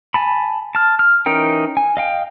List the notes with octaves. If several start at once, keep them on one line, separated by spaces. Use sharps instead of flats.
G#5 A5 B5
A5 F6
F6
E3 C#4 D#4 A#4 G5
G#5
D#5 F5 G5